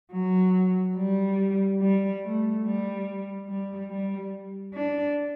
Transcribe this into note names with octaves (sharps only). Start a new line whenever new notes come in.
F#3
G3
G3
A3
G3
G3
G3
D4